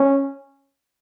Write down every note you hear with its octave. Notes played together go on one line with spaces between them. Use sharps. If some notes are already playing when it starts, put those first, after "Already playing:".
Already playing: C#4